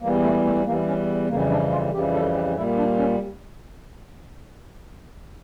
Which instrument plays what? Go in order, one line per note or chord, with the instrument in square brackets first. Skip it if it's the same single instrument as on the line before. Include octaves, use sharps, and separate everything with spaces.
[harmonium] E2 E3 G3 A#3
A3
A3
E2 E3 G3 A#3
C#4
F2 C#3 E3 G3 A#3
D4
F4
F2 C#3 E3 G3 G4
A4
G4
A#2 G3 E4
D4
C#4